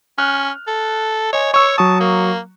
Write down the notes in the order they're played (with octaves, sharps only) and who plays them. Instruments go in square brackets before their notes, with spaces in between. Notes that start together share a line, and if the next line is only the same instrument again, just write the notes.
[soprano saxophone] C#4 [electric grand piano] F6 F#6
[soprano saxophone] A4
[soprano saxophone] C#5 [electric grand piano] D#5 G#5
[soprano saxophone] C#5 [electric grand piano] C#6 E6
[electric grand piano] F#3 C#6 D#6 [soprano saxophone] A5
[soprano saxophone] A#3